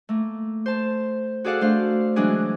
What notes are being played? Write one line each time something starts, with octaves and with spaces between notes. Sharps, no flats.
A3 A#3
C5 A5
F#4 G#4 A4 D5 F5 F#5
A3 D4 C5 F5
E3 F#3 G#3 B3 D4 G#4